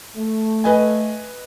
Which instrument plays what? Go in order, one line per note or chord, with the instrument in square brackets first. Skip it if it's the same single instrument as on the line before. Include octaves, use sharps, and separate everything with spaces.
[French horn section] A3
[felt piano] B4 D#5 G#5